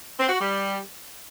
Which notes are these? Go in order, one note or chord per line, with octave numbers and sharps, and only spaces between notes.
C4
F#4
G3